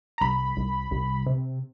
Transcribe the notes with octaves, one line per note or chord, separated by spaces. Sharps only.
A#5
C2 B5
C2
C2
C3